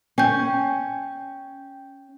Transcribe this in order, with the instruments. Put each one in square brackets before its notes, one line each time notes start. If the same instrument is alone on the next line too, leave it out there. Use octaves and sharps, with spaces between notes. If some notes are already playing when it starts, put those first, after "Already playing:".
[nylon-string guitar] C#4 [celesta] G5 G6